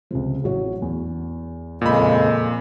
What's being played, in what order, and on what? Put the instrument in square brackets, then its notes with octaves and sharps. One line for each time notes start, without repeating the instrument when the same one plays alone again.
[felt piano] C#2 C3 F3
A1 F#3 C#5
E2
[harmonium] F2 C#3 G#3 [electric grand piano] A#2 B5